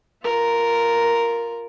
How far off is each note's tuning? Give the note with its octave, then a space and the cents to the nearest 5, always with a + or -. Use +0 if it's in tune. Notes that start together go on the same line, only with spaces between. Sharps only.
F4 +0 A#4 +0